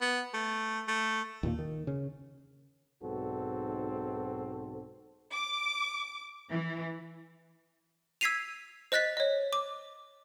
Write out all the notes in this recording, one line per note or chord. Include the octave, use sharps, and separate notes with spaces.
B3
A3
A3
D#2 A#2 A#3
D#3
C#3
B1 G#2 C4 F#4 A4
D6
E3
E6 G#6 B6 C7 D#7 F7
C5 D#5 F#6 A6 B6
C#5 D#5
D6